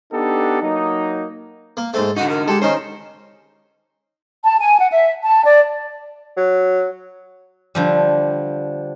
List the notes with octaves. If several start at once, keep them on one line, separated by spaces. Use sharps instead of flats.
B3 D4 D#4 G4 A4
F#3 A#3 D#4
A#3
G#2 A3 C5
D3 D#4 F#4 F#5
A#4
G#3 G4 A4
D#3 C#4 D#4 C5
A5
G#5
F#5
E5
A5
D5
F#3
D3 F3 G3